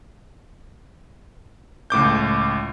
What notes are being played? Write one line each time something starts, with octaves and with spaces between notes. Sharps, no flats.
C#2 A2 D6 G6